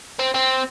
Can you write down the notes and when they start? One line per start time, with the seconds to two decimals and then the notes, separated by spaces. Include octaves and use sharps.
0.19 C4
0.35 C4